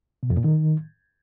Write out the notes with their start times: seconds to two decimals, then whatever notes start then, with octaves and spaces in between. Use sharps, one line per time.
0.23 B2
0.30 F2
0.37 A#2
0.44 D#3